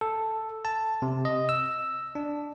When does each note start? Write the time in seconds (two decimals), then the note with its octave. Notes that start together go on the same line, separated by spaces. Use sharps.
0.01 A4
0.65 A5
1.02 C3
1.25 D#5
1.49 E6
2.15 D4